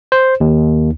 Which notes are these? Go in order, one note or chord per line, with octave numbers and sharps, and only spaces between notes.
C5
D#2